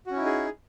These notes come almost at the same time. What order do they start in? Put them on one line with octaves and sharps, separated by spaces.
F#4 C#4 E4 D#4 G#4